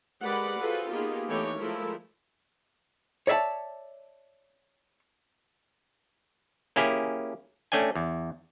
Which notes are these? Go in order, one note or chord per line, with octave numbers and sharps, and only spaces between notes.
G#3 G4 A#4 B4 D5 F#5
F4 F#4 G#4 A4 B4 C5
A#3 B3 D#4 F4 G4 G#4
E3 A3 B3 D#4 G4 C#5
F3 G#3 A3 E4 A#4
C#5 D5 E5 F5 A5
A#3 C#4 E4 G4 G#4
A3 C#4 D4 G5 G#5
E2